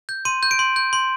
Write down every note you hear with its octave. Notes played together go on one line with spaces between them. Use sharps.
G6
C6 D#7
G6
D7
C6
G6
C6